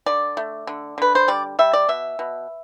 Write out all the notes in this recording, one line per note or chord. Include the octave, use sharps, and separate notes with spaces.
D3 D5
A3
D3
D3 B4
C5
G3 D5
G3 E5
D5
B2 E5
B2